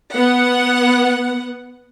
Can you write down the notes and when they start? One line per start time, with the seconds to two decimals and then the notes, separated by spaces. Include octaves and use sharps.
0.15 B3 F#5